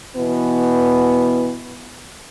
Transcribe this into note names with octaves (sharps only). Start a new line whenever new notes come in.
B2 E3 B3